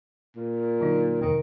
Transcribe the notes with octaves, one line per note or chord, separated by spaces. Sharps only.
A#2
D3 F#3 D#4
F2 C3 D#3